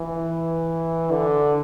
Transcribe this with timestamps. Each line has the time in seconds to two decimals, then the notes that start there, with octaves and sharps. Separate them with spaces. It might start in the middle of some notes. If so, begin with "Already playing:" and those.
Already playing: E3
1.11 D3